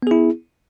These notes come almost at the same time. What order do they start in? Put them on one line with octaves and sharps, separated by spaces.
B3 G#4 E4